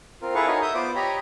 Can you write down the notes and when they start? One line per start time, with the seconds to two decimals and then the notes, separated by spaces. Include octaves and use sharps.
0.22 C4 F4 A#4
0.35 E4 G#4 A4 B4 F5 C#6
0.47 D#4 F#4 G#4 A#4 C#5 D#5
0.62 E5 D#6 G6
0.74 B3 F4 C5 D5 D6
0.95 G4 C#5 D#5 A#5 B5